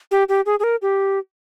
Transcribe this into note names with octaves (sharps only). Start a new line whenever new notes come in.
G4
G4
G#4
G#4
A#4
G4